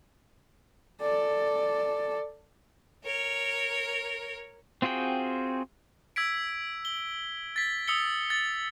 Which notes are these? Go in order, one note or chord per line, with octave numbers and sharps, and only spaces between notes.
A4 D5
A#4 C#5
C4 F4 F#4 G#4 G5
E6 G#6 B6 D7
G7
A6 B6
D#6 E6 C#7 G7
A6